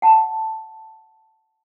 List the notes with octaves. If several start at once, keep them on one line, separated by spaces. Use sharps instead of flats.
F#5 A5